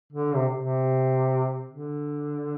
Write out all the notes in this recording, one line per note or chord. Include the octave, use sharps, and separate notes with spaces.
D3
C3
C3
D3